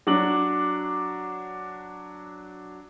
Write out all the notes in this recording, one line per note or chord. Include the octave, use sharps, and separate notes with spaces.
F#3 D4 D6 F#7